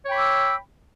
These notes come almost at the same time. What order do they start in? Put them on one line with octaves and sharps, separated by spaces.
C#5 G5 B5 D6 E6